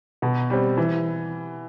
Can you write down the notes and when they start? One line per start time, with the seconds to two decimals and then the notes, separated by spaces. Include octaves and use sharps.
0.22 B2
0.50 G3 C4
0.77 E3